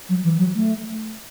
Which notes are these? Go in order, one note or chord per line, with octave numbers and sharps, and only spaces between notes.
F#3
E3
F#3
A3